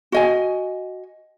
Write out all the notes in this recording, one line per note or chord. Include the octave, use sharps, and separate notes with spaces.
F#4 D#5 G#5